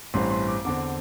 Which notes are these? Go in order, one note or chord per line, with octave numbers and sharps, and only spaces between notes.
A1 G2 E3 C4 C6
C6
D6
E2 D3 C4 D6